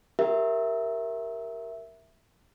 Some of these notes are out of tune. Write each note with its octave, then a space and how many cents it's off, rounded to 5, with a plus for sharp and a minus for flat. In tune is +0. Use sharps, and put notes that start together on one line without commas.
G4 +0 A#4 +0 E5 +0